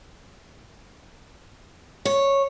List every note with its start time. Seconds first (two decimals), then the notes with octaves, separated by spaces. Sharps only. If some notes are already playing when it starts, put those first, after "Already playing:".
2.05 C#5